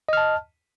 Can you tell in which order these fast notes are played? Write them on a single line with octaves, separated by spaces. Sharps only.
D#5 F6 A5